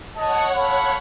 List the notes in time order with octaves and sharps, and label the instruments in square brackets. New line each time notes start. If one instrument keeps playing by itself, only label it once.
[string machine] C#5 F#5 [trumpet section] D#5 A5
[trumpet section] A4 F5 B5